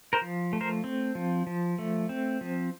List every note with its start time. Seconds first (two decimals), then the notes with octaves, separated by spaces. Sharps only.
0.13 A#4 C5
0.21 F3
0.53 A3
0.61 A#4 C5
0.84 C4
1.15 F3
1.47 F3
1.79 A3
2.09 C4
2.41 F3